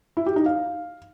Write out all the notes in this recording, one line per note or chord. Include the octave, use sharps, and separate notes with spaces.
E4
G4
D#4
F5